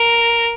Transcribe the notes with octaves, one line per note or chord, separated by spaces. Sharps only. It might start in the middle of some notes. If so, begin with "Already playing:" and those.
Already playing: A#4